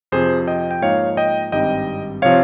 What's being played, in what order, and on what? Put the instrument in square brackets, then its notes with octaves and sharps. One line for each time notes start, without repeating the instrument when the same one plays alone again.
[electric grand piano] F2 C3 F3 G#4 C5
D#5 G5
G5
G#2 F3 A#3 D#4 C#5 F5
D#5 G5
G#1 G2 G3 C4 D#4 D#5 G5
C3 F3 C4 C#5 F5